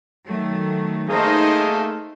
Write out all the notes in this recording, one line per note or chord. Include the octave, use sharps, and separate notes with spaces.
D#3 F#3 A3
A3 A#3 D#4 G#4 C5 D#5